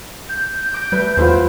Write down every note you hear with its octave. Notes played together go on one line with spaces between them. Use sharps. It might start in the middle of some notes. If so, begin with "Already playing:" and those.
G6
D6 A#6
G3 A3 B4
E2 F#3 E4 F4 G4 B4 C5